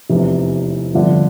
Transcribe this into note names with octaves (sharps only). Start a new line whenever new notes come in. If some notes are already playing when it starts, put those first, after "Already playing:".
F1 E2 C3 E3
G1 F2 D3